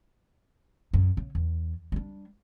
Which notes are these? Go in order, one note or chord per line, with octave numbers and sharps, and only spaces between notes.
F#2
C#3
E2
G3 D4